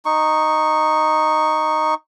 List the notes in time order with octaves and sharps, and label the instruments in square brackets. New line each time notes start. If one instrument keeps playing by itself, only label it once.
[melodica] D#4 C#6